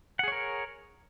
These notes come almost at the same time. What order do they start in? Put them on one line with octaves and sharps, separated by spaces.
F#5 G#4 C#5 A#4